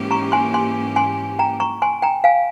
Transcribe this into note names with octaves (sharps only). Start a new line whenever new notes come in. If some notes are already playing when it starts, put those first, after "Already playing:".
Already playing: G#2 E3 A#3 C#4 G4
A#5 C#6
G#5 C6
G#5 C6
G#5 C6
G5 A#5
A#5 C#6
G#5 C6
G5 A#5
F5 G#5